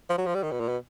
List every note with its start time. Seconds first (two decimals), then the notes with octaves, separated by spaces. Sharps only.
0.10 F3
0.18 F#3
0.26 F3
0.35 G3
0.43 D#3
0.51 B2
0.60 A#2
0.68 B2